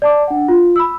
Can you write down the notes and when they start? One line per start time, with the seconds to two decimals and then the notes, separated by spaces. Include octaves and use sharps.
0.02 D5 A5 D6
0.27 D4 F#5
0.48 F4
0.76 B5 E6